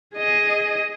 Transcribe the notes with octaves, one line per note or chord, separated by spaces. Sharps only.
G#4 D#5